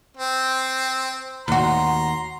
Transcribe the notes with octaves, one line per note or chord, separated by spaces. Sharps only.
C4
D#2 F#4 A#5 C6